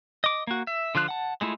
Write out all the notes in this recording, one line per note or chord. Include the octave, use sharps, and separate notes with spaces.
D#5 D6
A#3 F#4
E5
D3 F3 F4 F#6
F#5 A5
G#3 A3 E4 F4